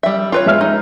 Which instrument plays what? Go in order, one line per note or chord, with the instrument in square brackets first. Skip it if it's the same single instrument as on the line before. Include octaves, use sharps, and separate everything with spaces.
[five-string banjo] G3 E5
F4 B4 C#5
[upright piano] G#3 E5 F6
[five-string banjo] D#4